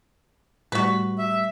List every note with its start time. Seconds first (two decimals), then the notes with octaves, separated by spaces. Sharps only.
0.72 A2 G3 F#4 B4
1.18 E5